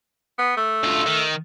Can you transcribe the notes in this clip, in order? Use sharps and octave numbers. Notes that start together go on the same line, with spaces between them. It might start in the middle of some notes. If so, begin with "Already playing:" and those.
B3
A3
D2 F4
D#3